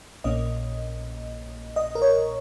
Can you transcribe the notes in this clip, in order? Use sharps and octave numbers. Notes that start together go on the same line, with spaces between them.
A#1 A#2 A#3 C#4 D#5
D#5
A#4
C#5